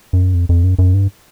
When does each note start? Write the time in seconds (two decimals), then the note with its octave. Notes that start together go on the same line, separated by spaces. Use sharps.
0.13 F#2
0.34 F2
0.49 F2
0.64 F#2
0.79 F#2
0.94 G2